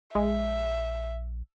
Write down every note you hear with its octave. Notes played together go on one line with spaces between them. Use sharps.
A#1 G#3 E5